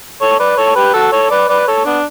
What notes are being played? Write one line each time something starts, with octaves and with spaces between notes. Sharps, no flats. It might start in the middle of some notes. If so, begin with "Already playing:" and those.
A4 C#5
B4 D5
A4 C#5
G4 B4
F#4 A4
A4 C#5
B4 D5
B4 D5
A4 C#5
B3 D4